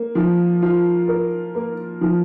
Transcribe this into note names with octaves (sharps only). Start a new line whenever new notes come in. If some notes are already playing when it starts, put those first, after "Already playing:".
Already playing: A#3
F3
F4
A#4
A#3
F3